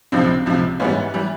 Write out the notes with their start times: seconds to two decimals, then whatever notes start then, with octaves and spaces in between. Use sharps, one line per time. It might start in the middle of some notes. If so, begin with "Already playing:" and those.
0.12 C#2 C3 F3 C4 D4
0.46 C#2 C3 F3
0.80 G#2 E3 G3 B3 C#4
1.14 E3 G3